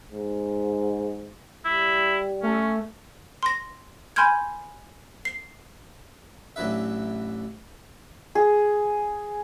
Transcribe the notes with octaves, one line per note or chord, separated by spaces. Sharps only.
G#2
G3 E4
A3 C#4
C6 A#6
G#5 B5 C6 F6 G6 G#6
C7
A1 F#3 D4 B4 E5
G#4